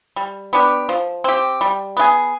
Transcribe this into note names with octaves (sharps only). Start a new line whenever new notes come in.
G3
B3 D4 G4
F3
C4 G4
G3
B3 F4 G#4